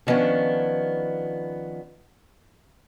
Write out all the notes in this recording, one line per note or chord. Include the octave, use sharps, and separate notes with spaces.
D3 D#3 F3 B3 C#4 D4